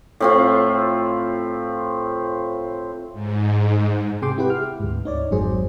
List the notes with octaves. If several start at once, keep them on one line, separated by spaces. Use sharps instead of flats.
A2 C4 F4
G#2
C3 G#4 G5 C6 D6
E4 G4 B4 F#5
F6
D2 G#2
D#4 C#5 D5
G#1 F2 G#2 F#3 G#4 C5